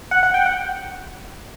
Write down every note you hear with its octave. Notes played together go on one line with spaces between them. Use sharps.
F#5
F#5
G5
F#5